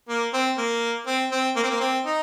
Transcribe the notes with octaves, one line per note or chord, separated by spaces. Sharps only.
A#3
C4
A#3
C4
C4
A#3
C4
A#3
C4
D#4